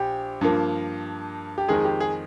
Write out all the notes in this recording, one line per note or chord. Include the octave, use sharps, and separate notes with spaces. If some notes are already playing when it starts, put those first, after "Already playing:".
Already playing: A#1 G4
G2 F3 A#3
G4
F2 D#3 G#3 G#4
G4
G#4